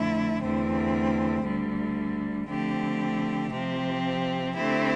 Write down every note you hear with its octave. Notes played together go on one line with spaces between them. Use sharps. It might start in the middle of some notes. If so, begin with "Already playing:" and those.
Already playing: F2 D3 A3 E4
E2 D3 A3 C4
D2 D3 G3
D3 F3 A3 C4 G4
C3 F3 C4 G4
D3 A3 C4 E4 G4